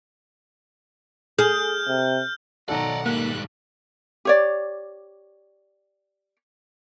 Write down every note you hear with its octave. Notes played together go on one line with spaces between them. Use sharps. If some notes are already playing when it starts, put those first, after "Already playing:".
G#4 F6 G6
C3
B1 D#3 A4 D5 D#5 F#5 A#5
G#2 G3 A#3 F#6
G4 C#5 D5